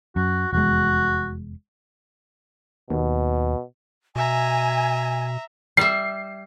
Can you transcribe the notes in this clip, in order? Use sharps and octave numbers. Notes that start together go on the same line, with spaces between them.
F#2 F#4
F1 E2 G#3 F#4
D#2 B2
B2 E5 G#5 A#5
G3 E5 C7